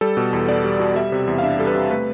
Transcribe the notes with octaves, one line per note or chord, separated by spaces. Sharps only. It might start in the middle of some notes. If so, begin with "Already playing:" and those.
G3 A4
B2
E2
B3 D5
G3
B2
G3 E5
C3
E2
F5
D4 E5
G3 A4
B4
C3
A3 B4